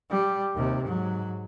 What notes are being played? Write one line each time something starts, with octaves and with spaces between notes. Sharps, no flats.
G3
D#2 C3
G#2 F#3